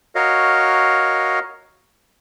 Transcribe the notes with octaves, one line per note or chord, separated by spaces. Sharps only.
F#4 A#4 C#5 D#5 F5